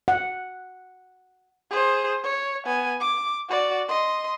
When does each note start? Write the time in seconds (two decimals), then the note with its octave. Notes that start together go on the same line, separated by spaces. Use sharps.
0.08 F#5
1.71 G#4 C5
2.24 C#5
2.65 B3 G#5
3.00 D6
3.48 F#4 D5
3.89 D#5 C6